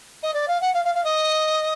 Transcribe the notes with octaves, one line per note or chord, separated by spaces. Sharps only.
D#5
D5
F5
F#5
F5
F5
F5
D#5